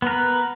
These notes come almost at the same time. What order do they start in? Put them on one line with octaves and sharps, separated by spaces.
B3 A#4 B4